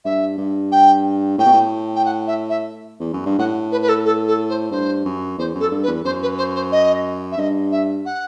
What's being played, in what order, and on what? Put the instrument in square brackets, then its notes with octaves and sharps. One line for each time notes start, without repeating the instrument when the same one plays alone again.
[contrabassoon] G2 [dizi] E5
[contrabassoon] G2
[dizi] G5
[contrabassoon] A2 [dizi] G5
[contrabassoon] B2
A2
[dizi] G5
F#5
E5
E5
[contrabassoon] E2
F#2
G2
[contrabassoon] A2 [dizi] F#5
[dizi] B4
B4
A4
A4
A4
C5
[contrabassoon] G2 [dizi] C5
[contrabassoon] F#2
[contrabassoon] E2 [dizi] C5
[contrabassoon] F#2
[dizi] A4
[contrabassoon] G2
[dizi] B4
[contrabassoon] E2
[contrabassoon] F#2 [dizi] C5
[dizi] B4
C5
C5
D#5
E5
[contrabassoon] G2 [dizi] D#5
[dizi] E5
F#5